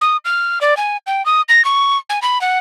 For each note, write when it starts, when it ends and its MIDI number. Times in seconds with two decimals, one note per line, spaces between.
0.01 0.17 87
0.25 0.59 89
0.61 0.77 74
0.77 0.97 80
1.07 1.25 79
1.26 1.42 87
1.49 1.64 94
1.65 1.98 85
2.10 2.19 80
2.22 2.41 83
2.41 2.59 78